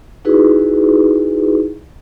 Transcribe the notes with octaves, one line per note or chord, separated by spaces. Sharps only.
D#4 E4 F#4 G#4 B4